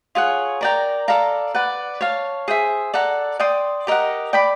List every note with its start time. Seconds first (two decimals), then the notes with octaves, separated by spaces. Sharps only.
0.15 F4 G#4 C#5 F#5
0.61 A#4 D5 G5 A#5
1.08 A4 D5 F5 A#5
1.54 B4 D5 F#5
2.01 C#5 F5 A5
2.48 G#4 C5 E5
2.94 A4 D5 F#5 A#5
3.40 D5 G5 C6 D#6
3.87 G4 A#4 D#5 F#5
4.33 D5 G5 B5 D6